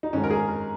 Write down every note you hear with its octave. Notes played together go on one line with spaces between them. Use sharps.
D#4
G#2 D#3 G#3 C#4
A#4
G#4
A#4